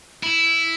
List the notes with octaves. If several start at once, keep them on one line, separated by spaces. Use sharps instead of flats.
E4